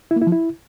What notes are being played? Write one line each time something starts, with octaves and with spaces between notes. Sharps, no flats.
E4
A#3
E4
F3
E4